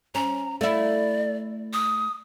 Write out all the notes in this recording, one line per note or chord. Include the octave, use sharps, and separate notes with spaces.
C#4 A#5
A3 E4 D5
D#6